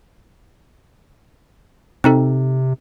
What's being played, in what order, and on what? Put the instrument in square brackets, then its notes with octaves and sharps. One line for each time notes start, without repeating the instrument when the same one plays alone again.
[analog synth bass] C3 [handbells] C4 D#4 A4